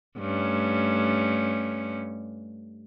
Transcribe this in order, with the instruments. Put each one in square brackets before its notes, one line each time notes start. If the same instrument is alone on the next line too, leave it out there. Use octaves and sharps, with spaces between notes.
[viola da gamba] G2 A3 C#4